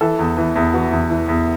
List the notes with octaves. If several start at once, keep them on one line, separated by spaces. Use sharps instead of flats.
E3 A4
E2
E3
E2
E3 F#4
E2
E3
E2